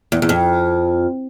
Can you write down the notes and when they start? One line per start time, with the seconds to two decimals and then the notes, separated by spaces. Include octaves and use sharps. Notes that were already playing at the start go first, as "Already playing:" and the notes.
0.12 E2
0.22 E2
0.29 F2